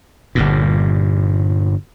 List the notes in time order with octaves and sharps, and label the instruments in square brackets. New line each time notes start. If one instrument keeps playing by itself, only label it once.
[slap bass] G1 G2 A#2